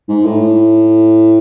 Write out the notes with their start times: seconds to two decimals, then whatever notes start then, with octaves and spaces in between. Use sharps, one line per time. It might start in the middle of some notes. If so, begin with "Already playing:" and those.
0.08 G#2
0.25 A2